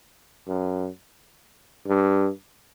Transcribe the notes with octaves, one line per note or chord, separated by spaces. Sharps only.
F#2
G2